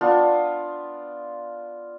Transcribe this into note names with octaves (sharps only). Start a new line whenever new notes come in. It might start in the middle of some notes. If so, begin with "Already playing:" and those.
B3 D4 F4